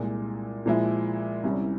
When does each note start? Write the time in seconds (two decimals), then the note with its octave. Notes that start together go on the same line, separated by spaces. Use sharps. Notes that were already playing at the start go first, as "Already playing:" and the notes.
Already playing: C2 A#2 G#3
0.66 A#2 F3 G#3 E4
1.43 C2 C3 G3 C#4 E4